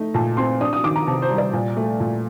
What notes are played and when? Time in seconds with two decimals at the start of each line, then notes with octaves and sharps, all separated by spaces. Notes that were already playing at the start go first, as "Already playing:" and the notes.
Already playing: A3 D#4
0.14 A#2 A5
0.37 C4 C6
0.61 D4 D#6
0.73 D#6
0.84 D#3 D6
0.96 A#5
1.07 C3 A5
1.22 C5
1.30 G3
1.38 D5
1.53 A#2
1.77 A3
2.00 A#2